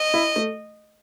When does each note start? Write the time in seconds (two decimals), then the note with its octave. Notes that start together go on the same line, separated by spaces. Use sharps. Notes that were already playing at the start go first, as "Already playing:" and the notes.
Already playing: D#5
0.14 E4
0.36 A3